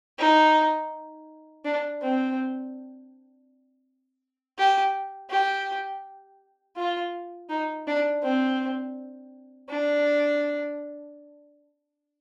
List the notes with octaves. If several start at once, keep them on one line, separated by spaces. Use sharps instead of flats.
D#4
D4
C4
G4
G4
F4
D#4
D4
C4
D4